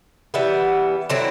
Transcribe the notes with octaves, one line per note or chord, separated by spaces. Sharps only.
E3 G3 B3
D3 F#3 C4 E4